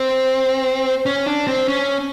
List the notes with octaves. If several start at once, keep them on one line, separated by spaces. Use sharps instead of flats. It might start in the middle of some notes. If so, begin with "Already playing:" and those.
Already playing: C4
C#4
D4
C4
C#4